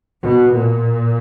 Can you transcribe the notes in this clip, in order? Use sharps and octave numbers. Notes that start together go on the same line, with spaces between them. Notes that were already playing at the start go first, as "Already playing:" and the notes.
B2
A#2